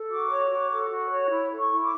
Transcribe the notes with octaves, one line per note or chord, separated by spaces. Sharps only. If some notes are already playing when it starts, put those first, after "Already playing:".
Already playing: A4
F#4 D6
C#5
F#4 D6
A4
F#4
C#5
E4
A4
C#6
E4
D6